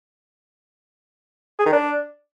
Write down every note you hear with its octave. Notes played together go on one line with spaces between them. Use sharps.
G#4
D#3
D4